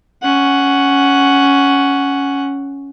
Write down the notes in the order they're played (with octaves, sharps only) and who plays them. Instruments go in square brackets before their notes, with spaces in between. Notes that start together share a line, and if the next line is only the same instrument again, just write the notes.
[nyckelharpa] C#4 F#5